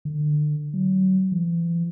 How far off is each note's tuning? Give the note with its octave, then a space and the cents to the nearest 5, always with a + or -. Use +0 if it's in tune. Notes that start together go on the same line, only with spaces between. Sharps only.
D3 +30
F#3 +30
E3 +40